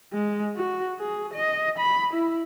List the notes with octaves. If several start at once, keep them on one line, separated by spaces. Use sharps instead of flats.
G#3
F#4
G#4
D#5
B5
E4